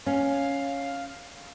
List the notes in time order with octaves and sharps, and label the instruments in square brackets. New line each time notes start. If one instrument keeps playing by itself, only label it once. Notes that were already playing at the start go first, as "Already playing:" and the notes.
[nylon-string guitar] C#4 [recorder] F5